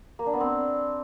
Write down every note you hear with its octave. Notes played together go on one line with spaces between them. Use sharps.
A#3
D4
B3
C4